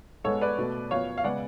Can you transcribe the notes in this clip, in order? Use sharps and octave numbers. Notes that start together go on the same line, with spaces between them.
G#2 G#3 B3 A4 C#5
B4 D5
B2 A3
F#2 F3 B3 C#5 F5
F5
C#3 G#3 B3 D5 F#5